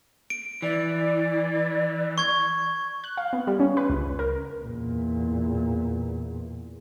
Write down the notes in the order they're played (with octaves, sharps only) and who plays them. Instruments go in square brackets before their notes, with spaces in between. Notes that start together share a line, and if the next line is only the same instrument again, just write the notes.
[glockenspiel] D7
[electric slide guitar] E3 [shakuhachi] D5
[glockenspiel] C#6 G#6
[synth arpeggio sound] F#6
F5
B3
G3
C#4
B4
C#2
A#4
[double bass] E2 A#2